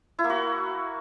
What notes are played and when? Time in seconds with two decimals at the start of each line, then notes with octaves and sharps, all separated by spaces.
0.19 E4
0.24 A#3
0.30 F#4